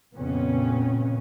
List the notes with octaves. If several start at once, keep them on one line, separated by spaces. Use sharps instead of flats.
F2 A#2 C#3 B3 C#4